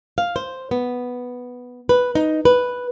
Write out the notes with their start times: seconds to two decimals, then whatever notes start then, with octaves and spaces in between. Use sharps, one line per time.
0.18 F5
0.36 C5
0.71 B3
1.89 B4
2.15 D#4
2.45 B4